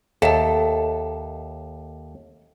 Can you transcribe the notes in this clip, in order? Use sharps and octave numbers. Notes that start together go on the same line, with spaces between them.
D#2 A4 E5 A5